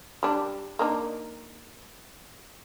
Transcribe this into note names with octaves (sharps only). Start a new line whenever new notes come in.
G3 D4
A#3 D4 D#4